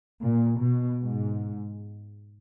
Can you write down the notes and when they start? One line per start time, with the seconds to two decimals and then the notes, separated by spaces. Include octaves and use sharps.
0.22 A#2
0.60 B2
0.99 G#2